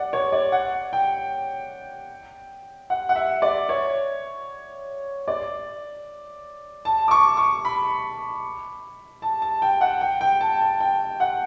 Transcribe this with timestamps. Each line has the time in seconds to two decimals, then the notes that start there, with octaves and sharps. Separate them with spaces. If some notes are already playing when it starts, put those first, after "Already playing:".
Already playing: D5 F#5
0.13 C#5
0.32 D5
0.52 F#5
0.93 G5
2.90 F#5
3.09 F#5
3.16 E5
3.42 D5
3.69 C#5
5.28 D5
6.85 A5
7.08 D6
7.11 C#6
7.37 C#6
7.65 B5
9.22 A5
9.42 A5
9.62 G5
9.81 F#5
10.01 G5
10.21 G5
10.41 A5
10.61 A5
10.80 G5
11.20 F#5